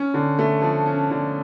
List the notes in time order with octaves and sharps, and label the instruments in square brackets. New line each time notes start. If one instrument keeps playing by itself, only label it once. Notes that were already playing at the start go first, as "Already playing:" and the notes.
Already playing: [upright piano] C#4
D3
A3
F3
C#4
D3